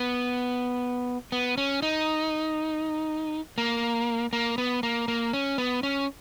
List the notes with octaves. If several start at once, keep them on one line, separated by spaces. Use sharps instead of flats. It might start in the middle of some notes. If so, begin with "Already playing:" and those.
Already playing: B3
B3
C#4
D#4
A#3
A#3
B3
A#3
A#3
C#4
B3
C#4